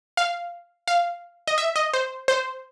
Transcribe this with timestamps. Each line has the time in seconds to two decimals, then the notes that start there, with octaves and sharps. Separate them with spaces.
0.17 F5
0.88 F5
1.48 D#5
1.58 E5
1.76 D#5
1.94 C5
2.28 C5